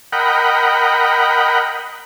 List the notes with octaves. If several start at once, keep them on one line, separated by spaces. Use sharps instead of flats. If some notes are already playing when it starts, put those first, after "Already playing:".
A#4 D#5 F#5 G5 B5